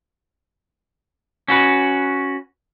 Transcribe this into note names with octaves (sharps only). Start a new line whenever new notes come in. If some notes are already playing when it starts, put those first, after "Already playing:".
C#4 F#4 B4